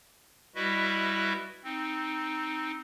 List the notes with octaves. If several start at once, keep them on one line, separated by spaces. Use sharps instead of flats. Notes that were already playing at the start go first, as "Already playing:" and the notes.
G3 E4 F#4 B4 D#5 E5
C4 D#4